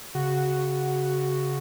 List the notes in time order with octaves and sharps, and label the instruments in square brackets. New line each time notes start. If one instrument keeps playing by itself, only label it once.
[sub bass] C#3 [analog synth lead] F#4